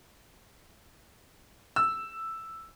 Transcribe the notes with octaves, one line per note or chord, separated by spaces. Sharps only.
E6